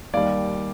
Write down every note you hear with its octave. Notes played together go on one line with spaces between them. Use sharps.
D#2 D#3 G3 D5 F5